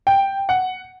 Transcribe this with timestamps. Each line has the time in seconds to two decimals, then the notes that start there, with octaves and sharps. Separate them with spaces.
0.07 G5
0.49 F#5